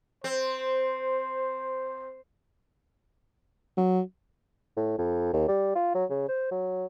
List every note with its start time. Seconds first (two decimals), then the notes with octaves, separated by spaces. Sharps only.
0.24 C4 C5
3.77 F#3
4.77 A2
4.98 F2
5.33 D#2
5.48 G3
5.75 F4
5.95 F#3
6.10 C#3
6.28 C5
6.51 F#3